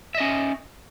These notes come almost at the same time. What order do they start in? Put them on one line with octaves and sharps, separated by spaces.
E5 D#5 C#4